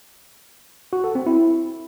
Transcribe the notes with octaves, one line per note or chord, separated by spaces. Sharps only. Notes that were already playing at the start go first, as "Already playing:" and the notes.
F#4
A4
C4
E4